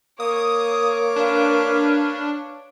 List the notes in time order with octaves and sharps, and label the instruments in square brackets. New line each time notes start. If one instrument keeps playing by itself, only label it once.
[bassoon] A#3 [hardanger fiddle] C#5 D6 [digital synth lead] D#6
[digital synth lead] D4 [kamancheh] B4 F5